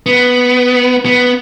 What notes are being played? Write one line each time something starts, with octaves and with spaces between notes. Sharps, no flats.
B3
B3